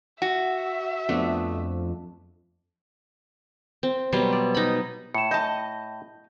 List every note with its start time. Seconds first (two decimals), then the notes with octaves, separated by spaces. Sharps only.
0.22 F#4 E5
1.09 F2 A3 B3 D4
3.83 C4
4.12 B2 F#3 G3 C5
4.33 D5
4.55 D#4 B5
5.14 A2 C#7 E7
5.31 D#5 A5 G6